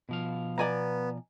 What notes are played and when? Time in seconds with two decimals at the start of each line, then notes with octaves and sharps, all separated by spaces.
0.09 B2 F3 F5
0.58 B3 D5 G#5 A#5